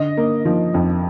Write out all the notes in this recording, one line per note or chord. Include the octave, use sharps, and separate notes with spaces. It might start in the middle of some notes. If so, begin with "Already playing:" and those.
Already playing: D3 D#5
A#3
F3
F2